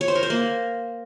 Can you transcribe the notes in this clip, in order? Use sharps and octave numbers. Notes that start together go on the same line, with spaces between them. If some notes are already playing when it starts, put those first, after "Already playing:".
C#5
C5
A#4
C5
A#3